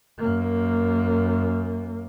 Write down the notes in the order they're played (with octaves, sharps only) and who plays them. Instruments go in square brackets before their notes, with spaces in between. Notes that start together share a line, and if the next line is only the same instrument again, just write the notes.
[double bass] F#2 A#3